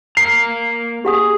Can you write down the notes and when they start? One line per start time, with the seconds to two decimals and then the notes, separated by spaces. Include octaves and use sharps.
0.17 A#3 A#4 A#5 C7
1.05 G4 G#4 F#5 D#6